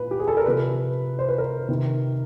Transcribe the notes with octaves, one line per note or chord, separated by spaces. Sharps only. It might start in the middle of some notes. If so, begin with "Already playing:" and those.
Already playing: A#2 B4
G4
G#4
A4
A#4
C3 F3 B4
C5
B4
A#4
C3 D#3